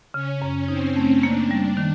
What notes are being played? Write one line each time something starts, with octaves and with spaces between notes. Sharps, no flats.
C#3 C#4
F#2
C4 D#4
A3
A#3 D4
G3
D#3